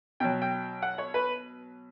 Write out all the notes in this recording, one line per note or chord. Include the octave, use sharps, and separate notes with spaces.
B2 F#3 G5
G5
F#5
C#5
B4